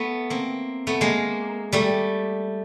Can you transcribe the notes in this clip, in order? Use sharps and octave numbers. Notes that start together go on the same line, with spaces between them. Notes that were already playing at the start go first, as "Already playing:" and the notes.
Already playing: A3 B3
A#3 C4
A3 B3
G#3 A#3
G3 A3